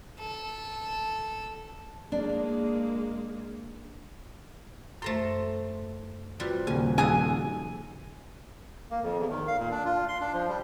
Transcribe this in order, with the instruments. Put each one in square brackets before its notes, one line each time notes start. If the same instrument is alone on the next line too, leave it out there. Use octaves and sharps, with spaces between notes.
[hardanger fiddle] A4
[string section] G#3 A#3 [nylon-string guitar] D4
[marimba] F#2 A4 C5 [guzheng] A3 A#5 C6
[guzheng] C3 G3 [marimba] F4 F#4 B4
[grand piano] D#1 [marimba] C#3 G3 [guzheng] G#5
[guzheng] F2 G#4 [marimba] D#4 F#4 E6 [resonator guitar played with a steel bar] G#5
[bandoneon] A#3
F2
E2
D#3
F5
A#2
D4
F4
C6
D4
F3
G3